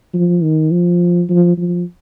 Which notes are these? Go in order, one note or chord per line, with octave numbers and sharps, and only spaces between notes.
F3
D#3
F3
F3
F3